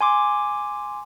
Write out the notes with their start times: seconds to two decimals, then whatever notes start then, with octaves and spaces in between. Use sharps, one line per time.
0.01 G#5 C6 D6